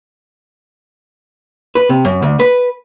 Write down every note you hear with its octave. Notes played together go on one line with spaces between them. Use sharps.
B4
C3
F#2
D2
B4